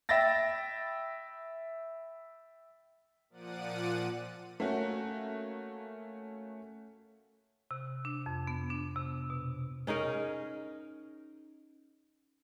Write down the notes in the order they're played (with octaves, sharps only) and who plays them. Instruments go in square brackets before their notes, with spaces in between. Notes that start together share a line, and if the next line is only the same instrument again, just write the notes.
[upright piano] E5 G5 B5 A6 A#6
[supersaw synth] A#2 F3 D5 F#5 D#7
[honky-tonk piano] A3 A#3 C#4 F#4
[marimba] C3
D4
F2
B3
D4
C3
B2
[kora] C#4 D#4 G#4 A#4